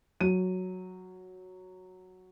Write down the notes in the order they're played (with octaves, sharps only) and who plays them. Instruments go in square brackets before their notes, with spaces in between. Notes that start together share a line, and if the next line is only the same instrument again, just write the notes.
[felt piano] F#3 D#7